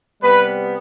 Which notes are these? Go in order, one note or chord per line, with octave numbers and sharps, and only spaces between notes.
C3 G3 B3 B4